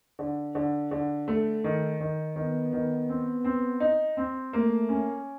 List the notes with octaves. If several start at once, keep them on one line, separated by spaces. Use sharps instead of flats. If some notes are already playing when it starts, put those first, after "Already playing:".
D3
D3
D3
A3
D#3
D#3
D#3 B3
D#3
C4
C4
D#4
C4
A3 A#3
C#4